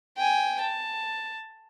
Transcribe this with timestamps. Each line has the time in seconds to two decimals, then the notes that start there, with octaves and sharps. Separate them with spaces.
0.17 G5 G#5
0.61 A5